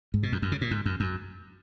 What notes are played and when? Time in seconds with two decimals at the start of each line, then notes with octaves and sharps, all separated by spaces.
0.14 G#2
0.23 B2
0.32 F2
0.42 F#2
0.52 C#3
0.61 A#2
0.71 G#2
0.85 F#2
1.00 F#2